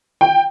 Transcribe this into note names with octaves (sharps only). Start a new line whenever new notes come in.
G5